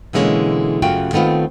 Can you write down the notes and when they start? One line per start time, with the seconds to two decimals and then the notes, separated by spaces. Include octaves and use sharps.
0.13 B2 D3 E3 G#3 A#3 C#4
0.82 F#2 C#3 A3 F4 F#4 G5
1.13 D#3 A3 B3 C4 F4